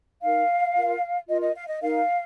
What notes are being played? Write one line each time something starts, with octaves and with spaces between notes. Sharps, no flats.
D#4 A#4 F5
F4 A#4
F4 A#4 D#5
D#5
F5
D#5
D#4 A#4 F5